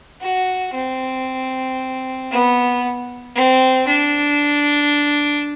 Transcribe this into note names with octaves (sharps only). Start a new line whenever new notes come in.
F#4
C4
B3
C4
D4